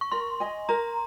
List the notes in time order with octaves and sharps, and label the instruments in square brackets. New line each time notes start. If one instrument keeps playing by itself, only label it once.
[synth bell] C#6
[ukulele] A#4 [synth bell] C6
[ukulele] D#5 G#5
[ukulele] A#4 [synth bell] A#5